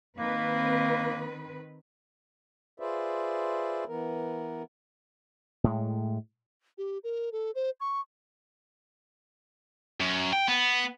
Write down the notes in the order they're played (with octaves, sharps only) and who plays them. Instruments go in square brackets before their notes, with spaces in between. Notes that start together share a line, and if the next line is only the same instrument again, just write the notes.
[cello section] D#3 C4 B4 [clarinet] A#3
[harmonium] F4 G#4 B4 C5 D5 E5
E3 B3 A#4
[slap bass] A2 G#3
[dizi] G4
A#4
A4
C5
C#6
[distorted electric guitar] F#2
G5
B3